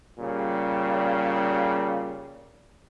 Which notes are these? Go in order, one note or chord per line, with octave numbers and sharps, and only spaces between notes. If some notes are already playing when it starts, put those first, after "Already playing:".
A#2 C#3 G3